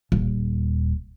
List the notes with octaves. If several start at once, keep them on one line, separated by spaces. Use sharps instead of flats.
D#1